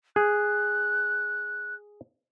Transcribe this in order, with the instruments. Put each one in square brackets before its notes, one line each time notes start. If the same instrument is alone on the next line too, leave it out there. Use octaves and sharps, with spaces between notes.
[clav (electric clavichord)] G#4 [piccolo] F#6